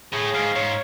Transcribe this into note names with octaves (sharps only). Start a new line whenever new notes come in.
A2 G#4
G#2 F5
G#2 C#5